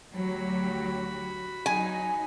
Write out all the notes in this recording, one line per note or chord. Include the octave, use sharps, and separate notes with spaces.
D2 F#3 F#4 G4 B5
F#3 D#4 G#5